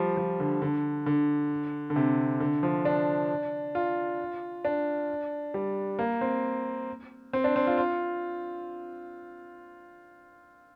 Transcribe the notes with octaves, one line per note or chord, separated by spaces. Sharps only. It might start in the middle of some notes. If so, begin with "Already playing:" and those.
Already playing: F3 G3
F3
D3
D3
D3
D3
C3
D3
F3
D4
F4
D4
G3
A#3
C4
C4
D4
C4
F4
F4